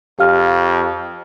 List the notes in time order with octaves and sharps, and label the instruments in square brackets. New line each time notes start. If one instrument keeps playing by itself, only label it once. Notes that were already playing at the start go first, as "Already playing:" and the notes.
[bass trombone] F2 [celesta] G4 F5 F6